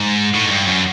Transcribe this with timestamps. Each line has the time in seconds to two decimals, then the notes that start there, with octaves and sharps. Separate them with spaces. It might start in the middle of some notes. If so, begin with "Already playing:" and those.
Already playing: G#2
0.34 A2
0.46 G#2
0.51 G2
0.67 F#2